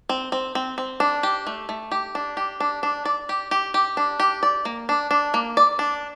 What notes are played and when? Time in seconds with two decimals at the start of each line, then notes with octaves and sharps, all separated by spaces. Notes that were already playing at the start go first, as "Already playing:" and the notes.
0.09 C4
0.32 C4
0.55 C4
0.78 C4
1.00 D4
1.23 G4
1.47 A3
1.69 A3
1.92 G4
2.15 D4
2.37 G4
2.60 D4
2.83 D4
3.05 D5
3.29 G4
3.51 G4
3.74 G4
3.97 D4
4.20 G4
4.43 D5
4.65 A#3
4.89 D4
5.11 D4
5.34 A#3
5.57 D5
5.79 D4